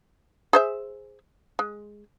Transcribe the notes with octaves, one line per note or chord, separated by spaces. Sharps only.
G#4 C5 E5
G#3